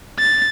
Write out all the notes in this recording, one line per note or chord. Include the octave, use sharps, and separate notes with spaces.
A6